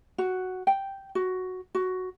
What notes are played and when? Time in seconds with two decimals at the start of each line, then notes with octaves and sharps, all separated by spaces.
0.18 F#4
0.67 G5
1.15 F#4
1.75 F#4